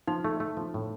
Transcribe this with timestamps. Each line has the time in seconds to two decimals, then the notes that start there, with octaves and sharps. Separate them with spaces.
0.08 F3 D#4
0.25 A3
0.40 A3
0.57 F3
0.74 A2